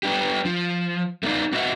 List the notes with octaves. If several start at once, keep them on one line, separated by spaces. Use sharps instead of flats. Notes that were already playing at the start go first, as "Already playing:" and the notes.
B3 D4 G4
F3
A3 B3 D#4 D5 F5
B3 F#4 D#5 E5 F#5